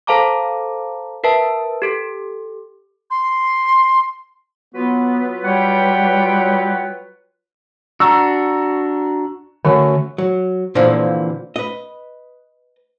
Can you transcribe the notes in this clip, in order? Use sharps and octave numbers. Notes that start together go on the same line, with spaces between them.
A4 C5 F5 A5 A#5 D6
A#4 B4 E5 A5
G4 A4
C6
F#3 B3 F4 B4
G3 C#5 F#5 G5
D4 F#4 A#5 C#6 E6
D3 A3 C#4 F#4
F#3
A#2 D3 E3 F3 C4
B4 D#5